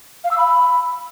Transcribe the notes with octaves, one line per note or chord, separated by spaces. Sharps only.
F5
E6
B5